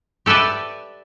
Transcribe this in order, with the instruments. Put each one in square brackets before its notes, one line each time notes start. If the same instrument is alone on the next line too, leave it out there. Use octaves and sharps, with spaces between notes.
[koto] G4 A4 B4 D5 E5